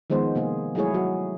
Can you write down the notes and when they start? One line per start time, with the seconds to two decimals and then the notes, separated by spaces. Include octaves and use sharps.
0.10 D#3 F3 G#3 B3 C5
0.35 C3 A#3 G#4
0.75 F#3 G#3 A3 E4 G#4 C#5
0.94 F#3 F#4